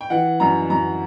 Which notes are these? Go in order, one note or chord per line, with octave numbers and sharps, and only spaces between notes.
G5
E3 F#5
F#2 A#5
F#2 A#5